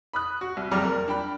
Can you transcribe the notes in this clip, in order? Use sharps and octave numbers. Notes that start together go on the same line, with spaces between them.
B5 D#6 F#6
F#4
C2
F#1 F2 G3 A#5 D6 F6
A#4
D4 G5 B5